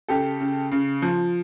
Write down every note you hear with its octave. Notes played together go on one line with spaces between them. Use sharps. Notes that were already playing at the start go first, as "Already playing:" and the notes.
C#3 G4 A4
C#3
C#3
F3